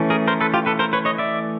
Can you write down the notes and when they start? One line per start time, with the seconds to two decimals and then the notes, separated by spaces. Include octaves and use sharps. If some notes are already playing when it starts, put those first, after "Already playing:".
Already playing: E3 A3 C#4
0.10 G#4 A#4
0.28 A#4 C5
0.41 A4 B4
0.54 F4 G4
0.66 A4 B4
0.79 A#4 C5
0.93 B4 C#5
1.05 C#5 D#5
1.18 D5 E5